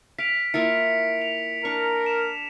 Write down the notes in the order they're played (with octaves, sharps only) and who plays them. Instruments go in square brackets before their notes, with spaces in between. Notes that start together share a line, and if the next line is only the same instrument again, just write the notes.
[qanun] F5 [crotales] B6 D7 F7
[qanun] A#3 E4 F4 [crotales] C#7
[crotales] F7
[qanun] D4 C#6 [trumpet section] A#4
[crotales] E7